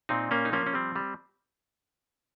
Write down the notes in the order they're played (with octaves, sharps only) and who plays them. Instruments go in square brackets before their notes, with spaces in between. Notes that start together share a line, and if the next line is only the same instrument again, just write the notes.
[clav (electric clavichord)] A#2 C4 D#4
A#3 C#4
D#4
F3 A#3 C#4
C#4
G3 C4
G3